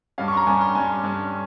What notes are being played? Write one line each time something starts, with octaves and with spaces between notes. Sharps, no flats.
G2 G3 C#4 F5
C#6
C6
A#5
G2 G3 C#4 G#5
C6
G2 G3 C#4 G#5
G2 G3 C#4